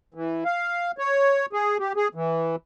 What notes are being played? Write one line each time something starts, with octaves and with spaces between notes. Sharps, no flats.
E3
F5
C#5
G#4
G4
G#4
E3